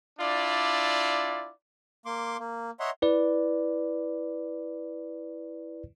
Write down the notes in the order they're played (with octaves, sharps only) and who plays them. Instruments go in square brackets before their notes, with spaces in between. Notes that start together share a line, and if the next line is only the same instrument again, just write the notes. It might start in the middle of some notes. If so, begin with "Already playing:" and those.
[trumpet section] D4 E4 F4 D5
[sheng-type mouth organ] A#3 C6 D6
A#3
C#5 D#5 E5 F#5 A#5 C6
[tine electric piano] E4 B4 D5